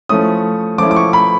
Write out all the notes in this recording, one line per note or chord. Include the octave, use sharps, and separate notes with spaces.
F3 A3 C#4 E4 D#6
F3 A3 C#4 E4 D6
D6
C#6
B5